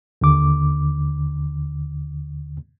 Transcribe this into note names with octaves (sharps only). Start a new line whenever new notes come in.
D#2 D3 D6